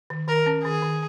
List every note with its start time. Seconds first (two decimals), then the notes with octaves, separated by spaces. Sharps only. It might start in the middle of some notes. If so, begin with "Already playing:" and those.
0.10 D#3
0.28 D#3 A#4
0.46 C#4
0.64 D#3 G#4
0.82 D#3